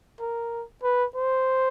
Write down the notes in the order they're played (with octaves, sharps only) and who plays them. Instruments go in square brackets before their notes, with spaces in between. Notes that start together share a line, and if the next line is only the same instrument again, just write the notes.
[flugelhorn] A#4
B4
C5